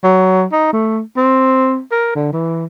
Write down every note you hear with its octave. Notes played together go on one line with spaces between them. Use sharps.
F#3
D#4
A3
C4
A#4
D3
E3